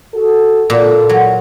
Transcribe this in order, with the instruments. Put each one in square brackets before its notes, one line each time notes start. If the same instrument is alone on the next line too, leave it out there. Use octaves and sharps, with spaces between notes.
[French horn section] F#4 A4
[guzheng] A#2 [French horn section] F4 A4
[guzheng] F#3